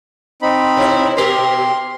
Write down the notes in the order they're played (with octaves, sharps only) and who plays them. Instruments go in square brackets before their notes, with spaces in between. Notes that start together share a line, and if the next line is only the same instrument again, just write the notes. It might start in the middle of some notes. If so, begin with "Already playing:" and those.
[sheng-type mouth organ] C4 D#4 B5
[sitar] C3 E4
[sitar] B2 G4 A#4 [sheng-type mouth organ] C6